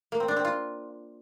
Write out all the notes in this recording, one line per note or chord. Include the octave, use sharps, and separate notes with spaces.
A#3
C4
D4
C4
F4